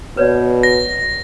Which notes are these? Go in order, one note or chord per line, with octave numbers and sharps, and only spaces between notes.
B2 B4 C#5 D5
A#6